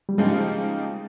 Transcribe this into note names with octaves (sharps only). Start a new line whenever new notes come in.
G3
C#3 F3 G#3 A#3 D#4 G4